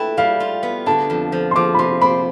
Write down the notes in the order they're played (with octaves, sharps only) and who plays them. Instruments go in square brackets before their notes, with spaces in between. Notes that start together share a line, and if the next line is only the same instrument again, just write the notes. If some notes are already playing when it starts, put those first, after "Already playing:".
Already playing: [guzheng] A3 E4 B4 [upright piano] G5
[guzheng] G3 [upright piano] F5
[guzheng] F4
B3
[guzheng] D3 [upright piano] A5
[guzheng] F2
F3
[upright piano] C6
[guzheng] F3 [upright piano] D6
[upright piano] B5
[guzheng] C3 [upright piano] C6
[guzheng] C4 [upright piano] B5